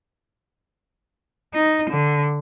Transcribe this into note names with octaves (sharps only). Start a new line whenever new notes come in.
D#4
D3